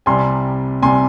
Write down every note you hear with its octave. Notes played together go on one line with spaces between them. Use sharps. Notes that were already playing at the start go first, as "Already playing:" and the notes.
C2 C3 G3 G#5 C6
C2 C3 G3 G#5 C6